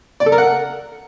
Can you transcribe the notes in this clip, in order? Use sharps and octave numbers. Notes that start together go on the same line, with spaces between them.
D5
A4
A#4
F#5